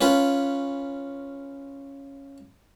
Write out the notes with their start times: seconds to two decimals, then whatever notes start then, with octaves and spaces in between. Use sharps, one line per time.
0.01 C#4 F4 B4